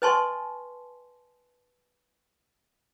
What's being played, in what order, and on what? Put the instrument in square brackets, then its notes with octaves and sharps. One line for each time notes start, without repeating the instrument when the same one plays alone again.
[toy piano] B4 D#5 G#5 A5 C6 C#6